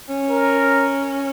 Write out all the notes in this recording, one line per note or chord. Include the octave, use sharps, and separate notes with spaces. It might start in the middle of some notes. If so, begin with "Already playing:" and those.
C#4
A#4